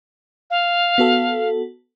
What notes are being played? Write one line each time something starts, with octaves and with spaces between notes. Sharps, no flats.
F5
B3 F#4 A4